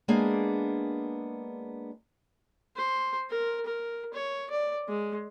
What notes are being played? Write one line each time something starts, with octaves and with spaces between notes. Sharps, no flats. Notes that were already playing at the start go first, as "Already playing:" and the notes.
G#3 A#3 B3 D4 G#4
C5
A#4
A#4
C#5
D5
G#3